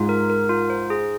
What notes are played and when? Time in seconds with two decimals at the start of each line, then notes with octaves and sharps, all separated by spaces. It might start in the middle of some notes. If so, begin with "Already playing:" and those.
Already playing: G#2 G#3 F4
0.09 A#4
0.30 A#4
0.49 F4
0.70 C5
0.90 G#4